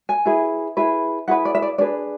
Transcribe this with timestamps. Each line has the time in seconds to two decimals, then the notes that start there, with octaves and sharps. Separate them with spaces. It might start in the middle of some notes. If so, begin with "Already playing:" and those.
0.09 G#5
0.26 E4 G#4 B4
0.77 E4 G#4 B4
1.28 E4 G#4 B4 F#5
1.45 D5
1.55 E5
1.62 D5
1.78 D4 G#4 B4 D5